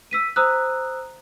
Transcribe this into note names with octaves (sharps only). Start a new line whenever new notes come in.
E6 B6 D#7
C5 A#5 D#6 E6 F#6